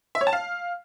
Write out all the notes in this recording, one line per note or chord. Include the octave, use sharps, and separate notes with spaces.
E5
C#5
A5
F5